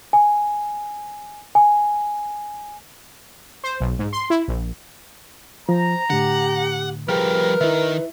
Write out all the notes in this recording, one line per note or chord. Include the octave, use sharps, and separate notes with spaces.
G#5
G#5
C5
B1
G#2
C6
E4
A#1
F3 C5 A#5
A2 D3 G4 F#5
F3 G3 G#4 A#4 B4 G5 F6
D#3 E4 E5